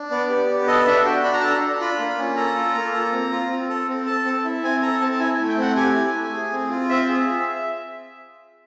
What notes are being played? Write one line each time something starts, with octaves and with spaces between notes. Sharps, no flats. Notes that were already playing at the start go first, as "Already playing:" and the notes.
Already playing: D4
B3 D5
G4
B3
A4 D#5
D4 E5
F#4 G5
D4 B5
A#5
A4 A5
A#5
D4
F4 B5
A#3
C#4
A4 A#5
F4
A#3
A4
C4
F4
C4
A4
C4
A4 A5
C4
E4
C4 G#5
A4 A#5
C4 A5
A5
E4 G#5
A3 G#5
G5
C4 F#5
G4 G#5
E4
A3
G#4
C4
F4
C4 E5
G#4